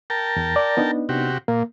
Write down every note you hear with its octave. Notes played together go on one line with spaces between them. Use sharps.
A#4 G5 A5
E2
D5
B3 D4 D#4
C3 F#4 G4
A#2 A#3